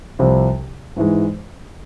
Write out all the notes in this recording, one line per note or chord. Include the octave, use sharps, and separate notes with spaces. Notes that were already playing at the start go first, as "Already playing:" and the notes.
C2 C3 F3
G#2 E3 G#3